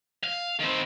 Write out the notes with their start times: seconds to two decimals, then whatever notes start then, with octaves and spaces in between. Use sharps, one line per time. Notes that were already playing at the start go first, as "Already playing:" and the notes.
0.24 F5
0.60 D#3 C4